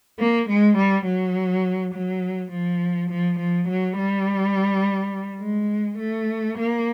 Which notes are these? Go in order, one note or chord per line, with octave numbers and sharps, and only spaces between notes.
A#3
G#3
G3
F#3
F#3
F3
F3
F3
F#3
G3
G#3
A3
A#3